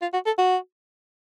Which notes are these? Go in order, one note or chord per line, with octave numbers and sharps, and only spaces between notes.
F4
F#4
A4
F#4